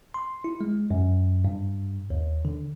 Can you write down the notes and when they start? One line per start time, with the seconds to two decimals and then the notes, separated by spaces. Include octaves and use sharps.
0.14 C6
0.44 E4
0.61 G#3
0.91 F#2
1.45 G2
2.10 D#2
2.45 D3